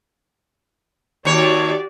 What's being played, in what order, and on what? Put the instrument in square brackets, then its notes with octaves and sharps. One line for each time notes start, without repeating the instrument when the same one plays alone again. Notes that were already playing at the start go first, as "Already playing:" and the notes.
[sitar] D#2 C#5 [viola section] F#4 G4 D5